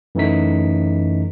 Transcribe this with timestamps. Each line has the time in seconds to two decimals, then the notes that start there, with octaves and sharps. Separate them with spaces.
0.15 F#2 E3 A3 D#4 B6